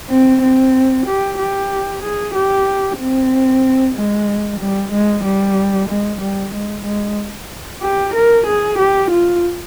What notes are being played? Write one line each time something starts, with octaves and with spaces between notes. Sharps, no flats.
C4
C4
G4
G4
G#4
G4
C4
G#3
G3
G#3
G3
G#3
G3
G#3
G#3
G4
A#4
G#4
G4
F4